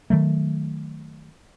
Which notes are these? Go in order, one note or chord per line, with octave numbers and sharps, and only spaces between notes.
D#3 F#3 A3